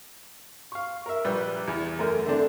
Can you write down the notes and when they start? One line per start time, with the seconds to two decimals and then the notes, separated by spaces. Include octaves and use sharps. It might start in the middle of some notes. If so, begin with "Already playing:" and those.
0.72 F5 C#6
1.06 A#4 E5
1.24 A#1 G3 B4 E6
1.68 E2
1.99 F#2 A3 A#4
2.26 D3 A3 C4 D4